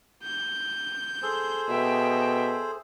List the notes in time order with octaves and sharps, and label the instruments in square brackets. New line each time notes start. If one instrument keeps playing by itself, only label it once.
[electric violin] G6
[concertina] G#4 A4 C5
[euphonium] B2 [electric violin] E5 G5